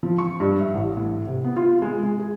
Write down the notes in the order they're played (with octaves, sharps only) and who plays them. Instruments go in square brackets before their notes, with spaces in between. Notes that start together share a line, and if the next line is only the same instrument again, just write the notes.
[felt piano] F3
C#6
G2
E5
A1
A2
C3
B3
F4
G#3
G#3
G#4